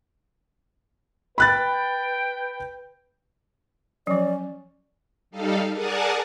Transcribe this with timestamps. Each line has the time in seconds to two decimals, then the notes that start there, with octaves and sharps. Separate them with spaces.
1.38 B4 G5 B5 F#6 A6
4.07 F3 F#3 C#4 D5
5.31 G3 D#4 A4 F5
5.72 G#4 A#4 D5 F#5 G#5 A5